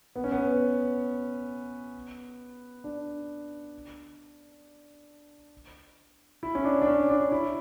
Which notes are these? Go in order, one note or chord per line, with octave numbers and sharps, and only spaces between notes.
B3
C#4
B3
D4
E4
C#4
D4
D4
C#4
D4
E4